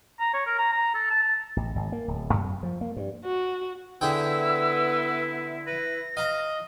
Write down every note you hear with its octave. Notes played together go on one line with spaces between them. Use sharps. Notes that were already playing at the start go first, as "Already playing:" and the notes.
A#5
C#5
A#4
A#5
A#5
A4
A5
A5
A1
G#1
A#3
D1
F#2
F3
A#3
G2
F#4
D3 B3 E4 G#4 G5 E6
B4 A#6
D#5 F5 A#5